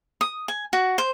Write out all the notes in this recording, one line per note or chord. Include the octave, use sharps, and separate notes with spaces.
D#6
G#5
F#4
C5